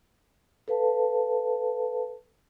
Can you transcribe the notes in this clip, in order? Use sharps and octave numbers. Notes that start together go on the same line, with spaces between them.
A4 B4 F5 A5